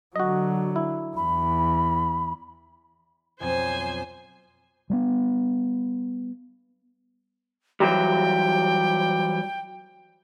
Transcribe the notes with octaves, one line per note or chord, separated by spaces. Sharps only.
D3 F#3 F#4 D#5
E4
E2 B5
B1 F2 C4 C5 G#5
G3 G#3 B3
E3 F#3 G3 G5